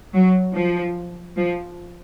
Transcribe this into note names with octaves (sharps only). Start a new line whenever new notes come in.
F#3
F3
F3